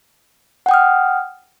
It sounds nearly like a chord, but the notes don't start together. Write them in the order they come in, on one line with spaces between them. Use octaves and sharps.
F#5 G5 D#6 F6